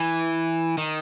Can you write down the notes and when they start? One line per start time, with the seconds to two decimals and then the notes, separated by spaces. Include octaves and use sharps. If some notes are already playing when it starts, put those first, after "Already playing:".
Already playing: E3
0.78 D#3